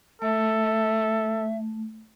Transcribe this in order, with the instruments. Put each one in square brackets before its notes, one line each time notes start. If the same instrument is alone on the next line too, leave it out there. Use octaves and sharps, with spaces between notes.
[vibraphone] A3 [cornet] A4 [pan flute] E5